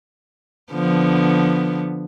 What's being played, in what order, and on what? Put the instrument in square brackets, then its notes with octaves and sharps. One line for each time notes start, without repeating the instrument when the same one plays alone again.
[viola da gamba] D3 F3 B3